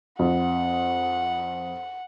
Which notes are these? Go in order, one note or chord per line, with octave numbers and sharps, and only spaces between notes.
F2 F#5